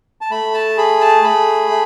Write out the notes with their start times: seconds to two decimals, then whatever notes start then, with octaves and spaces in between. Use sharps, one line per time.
0.21 A5
0.31 A3 B5
0.54 A5
0.77 G#4 B5
1.01 A5
1.24 A3 B5
1.70 A3